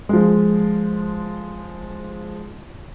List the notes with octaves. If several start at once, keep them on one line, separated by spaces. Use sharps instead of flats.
F3 G#3